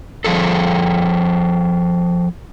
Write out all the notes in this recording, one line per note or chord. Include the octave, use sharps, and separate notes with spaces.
F3 G#4 A4